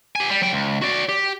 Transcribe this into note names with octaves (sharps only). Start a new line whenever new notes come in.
G4 G#5
G3
F#3 G5
C#2
F#4 D5
G4